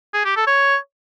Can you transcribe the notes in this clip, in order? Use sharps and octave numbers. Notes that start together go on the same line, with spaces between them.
G#4
G4
A4
C#5